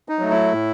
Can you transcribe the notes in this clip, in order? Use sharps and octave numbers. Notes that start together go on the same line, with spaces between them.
D#4
F#3 A3
E4
A2